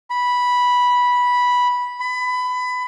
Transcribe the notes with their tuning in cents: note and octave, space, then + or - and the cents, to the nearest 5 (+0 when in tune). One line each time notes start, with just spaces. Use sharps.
B5 -10
B5 +20